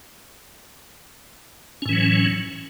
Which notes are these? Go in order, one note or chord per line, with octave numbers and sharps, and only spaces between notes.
A2 E3 F#3 C#4